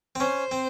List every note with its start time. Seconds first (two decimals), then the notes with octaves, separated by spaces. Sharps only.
0.15 C4
0.20 C#4 C5
0.51 C4